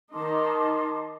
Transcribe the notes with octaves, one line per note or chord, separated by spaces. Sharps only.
D#3 D#4 A5 C6 D6